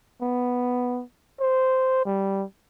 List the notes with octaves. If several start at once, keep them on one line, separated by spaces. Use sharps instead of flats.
B3
C5
G3